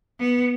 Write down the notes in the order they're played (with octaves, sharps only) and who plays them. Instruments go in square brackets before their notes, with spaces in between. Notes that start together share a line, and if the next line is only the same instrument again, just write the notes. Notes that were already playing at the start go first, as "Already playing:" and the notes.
[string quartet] B3